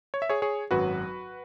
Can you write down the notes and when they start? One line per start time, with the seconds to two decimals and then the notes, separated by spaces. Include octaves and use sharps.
0.14 C#5
0.22 E5
0.29 G#4 C#5
0.42 G#4 C#5
0.71 G#1 F#2 F#3 F#4 B4